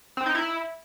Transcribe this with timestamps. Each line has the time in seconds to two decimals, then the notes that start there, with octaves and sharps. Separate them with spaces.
0.17 C4
0.26 D#4
0.35 E4